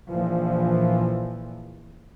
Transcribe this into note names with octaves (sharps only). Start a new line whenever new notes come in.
A#1 A#2 E3 F3